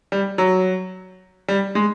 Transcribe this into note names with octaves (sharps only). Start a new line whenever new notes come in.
G3
F#3
G3
G#3